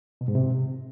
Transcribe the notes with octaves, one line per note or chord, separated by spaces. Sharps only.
B2
G#2
C3